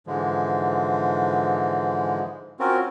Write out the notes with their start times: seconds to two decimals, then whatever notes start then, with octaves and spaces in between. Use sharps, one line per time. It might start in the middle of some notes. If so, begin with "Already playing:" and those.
0.07 G#2 D3 E3 F3 G#3
2.60 C4 C#4 F4 F#4 A#4